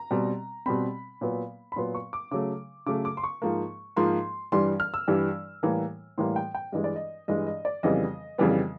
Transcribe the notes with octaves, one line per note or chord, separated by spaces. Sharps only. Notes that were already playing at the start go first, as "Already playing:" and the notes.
Already playing: A#5
B2 G3 C4
B2 G3 C4 B5
A#2 F#3 B3
B5
A#2 F#3 B3 C6
C#6
D6
C#3 F#3 A3 D6
C#3 F#3 A3 D6
D6
C6
C#6
G#2 F3 A#3
G#2 F3 A#3 C6
G2 E3 G3 C6
F6
E6
G2 E3 G3
A2 E3 G3 A#3
A2 E3 G3 A#3 C6
G5
G5
G2 E3 G#3 D#5
D5
D#5
G2 E3 G#3 D#5
D#5
D5
F2 C#3 E3 G3 B3 D#5
F2 C#3 E3 G3 B3